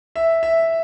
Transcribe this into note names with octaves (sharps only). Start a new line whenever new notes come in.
E5
E5